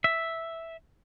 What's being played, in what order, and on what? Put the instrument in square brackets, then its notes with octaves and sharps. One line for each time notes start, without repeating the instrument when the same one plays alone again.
[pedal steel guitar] E5